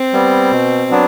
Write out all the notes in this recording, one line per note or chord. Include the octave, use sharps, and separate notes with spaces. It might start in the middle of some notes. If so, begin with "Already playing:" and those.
Already playing: C4
G3 B3
B2
F#3 B3 D4